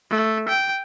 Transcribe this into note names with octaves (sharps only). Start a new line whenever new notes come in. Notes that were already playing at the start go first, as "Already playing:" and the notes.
A3
G5